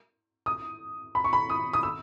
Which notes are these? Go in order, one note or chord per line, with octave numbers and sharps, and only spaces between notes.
D#6
B5
C#6
B5
D#6
D#6
E6